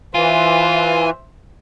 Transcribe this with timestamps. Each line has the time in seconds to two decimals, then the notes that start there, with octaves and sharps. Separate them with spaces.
0.15 E3 F4 C5 E5 G#5